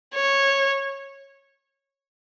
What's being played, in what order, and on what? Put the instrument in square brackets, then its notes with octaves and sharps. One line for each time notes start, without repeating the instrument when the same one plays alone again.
[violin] C#5